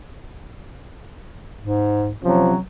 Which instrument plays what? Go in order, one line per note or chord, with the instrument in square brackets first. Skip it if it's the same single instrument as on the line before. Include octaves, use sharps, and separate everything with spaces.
[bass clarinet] G#2
[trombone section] C3 F3 C#4 [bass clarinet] F#3